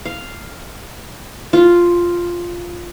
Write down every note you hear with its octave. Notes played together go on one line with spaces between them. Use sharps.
F5
F4